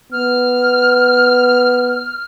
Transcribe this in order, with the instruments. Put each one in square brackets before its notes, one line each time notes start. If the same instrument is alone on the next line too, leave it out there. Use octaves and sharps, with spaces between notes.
[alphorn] B3 [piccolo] F6